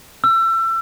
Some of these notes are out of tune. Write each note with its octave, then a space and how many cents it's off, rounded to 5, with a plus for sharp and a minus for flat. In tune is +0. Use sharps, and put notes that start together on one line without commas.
E6 +30